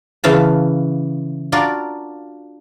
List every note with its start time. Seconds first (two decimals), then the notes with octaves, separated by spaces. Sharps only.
0.24 C#3 E3 E4 F5 A5
1.52 D4 F4 F#4 A#4 D5 F5